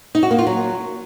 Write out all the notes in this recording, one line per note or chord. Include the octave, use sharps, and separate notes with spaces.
D#4
F#4
A#3
F4
F#3